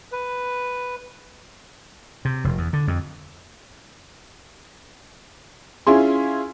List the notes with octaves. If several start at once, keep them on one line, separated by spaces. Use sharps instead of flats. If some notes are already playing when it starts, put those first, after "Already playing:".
B4
C3
F1
E2
D3
F2
C#4 E4 F4 G#4 C6